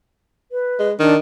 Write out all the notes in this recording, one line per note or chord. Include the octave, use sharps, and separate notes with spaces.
B4
G#3
D#3 D4